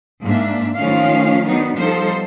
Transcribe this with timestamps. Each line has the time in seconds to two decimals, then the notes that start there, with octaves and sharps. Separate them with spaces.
0.24 G#2 A#3 D4 E5
0.75 D#3 F3 A3 C#4 F5
1.44 D#3 F#3 B3 D4 D#4
1.76 F3 G3 B3 D#4 A4 C5